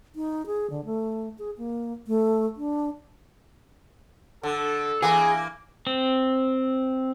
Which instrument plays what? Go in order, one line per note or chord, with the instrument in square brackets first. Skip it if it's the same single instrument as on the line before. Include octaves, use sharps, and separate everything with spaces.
[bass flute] D#4
G#4
D3
A3
G#4
A#3
A3
D4
[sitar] D3 [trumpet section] A4
[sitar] E3 A#3 [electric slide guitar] G#4
[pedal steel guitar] C4